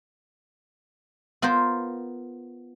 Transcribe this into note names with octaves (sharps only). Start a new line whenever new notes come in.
B3 F4 A#4 C5